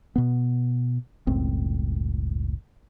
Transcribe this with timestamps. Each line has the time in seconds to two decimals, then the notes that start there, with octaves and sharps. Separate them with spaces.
0.16 B2 B3
1.27 F#1 C#2 A2 C4